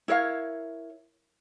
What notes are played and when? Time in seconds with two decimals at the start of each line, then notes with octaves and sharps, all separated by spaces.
0.08 E4 A#4 C#5 F5